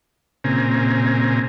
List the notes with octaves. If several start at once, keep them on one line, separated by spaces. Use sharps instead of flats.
A#2 C#3 C4 G#5 A#5